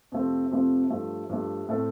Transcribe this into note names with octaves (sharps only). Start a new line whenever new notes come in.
F2 C3 F3 A3 C4
F2 C3 F3 A3 C4
G2 F3 A3
G2 F3 A3
A2 A3 C4 A4